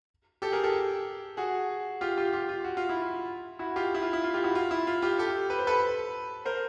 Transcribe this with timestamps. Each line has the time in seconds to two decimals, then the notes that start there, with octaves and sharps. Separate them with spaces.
0.42 G4 A4
0.52 G#4 A#4
0.64 G4 A4
1.37 F#4 G#4
2.01 F4 G4
2.17 F4 G4
2.33 F4 G4
2.49 F4
2.64 F#4
2.77 F4
2.89 E4
3.01 F4
3.59 E4 F#4
3.76 F4 G4
3.94 E4
4.02 F4
4.13 E4
4.24 F4
4.34 F4 G4
4.44 E4 F#4
4.55 F4
4.71 E4
4.87 F4
5.02 F4 G4
5.18 G4 A4
5.50 B4
5.59 C5
5.67 A4 B4
6.45 A#4 C5